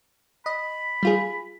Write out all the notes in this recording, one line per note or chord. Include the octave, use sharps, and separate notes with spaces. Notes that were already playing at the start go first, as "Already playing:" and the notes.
D#5 B5
G3 F4 G#4